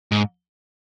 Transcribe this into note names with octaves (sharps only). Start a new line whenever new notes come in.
G#2